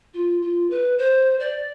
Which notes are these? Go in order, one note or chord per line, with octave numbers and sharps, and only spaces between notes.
F4
F4
B4
C5
D5